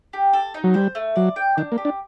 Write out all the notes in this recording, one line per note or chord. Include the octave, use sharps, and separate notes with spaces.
G4
A4
D#4
F#3
G3 C5
A3
F#3 D5
G5
D#3 D4
A#3
G4
D4